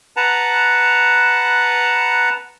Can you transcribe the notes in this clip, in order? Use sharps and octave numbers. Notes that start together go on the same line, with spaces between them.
B4 F#5 A5 A#5